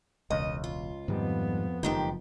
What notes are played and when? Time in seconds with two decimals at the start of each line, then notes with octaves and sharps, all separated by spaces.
0.30 E1 C#2 D#5
0.64 F4
1.08 F2 G#2 D#3 G3 B3
1.83 F#1 G#2 D#3 F3 D#4 G4